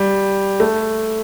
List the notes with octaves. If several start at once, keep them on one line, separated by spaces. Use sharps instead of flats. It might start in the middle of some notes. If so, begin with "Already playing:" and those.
Already playing: G3
A3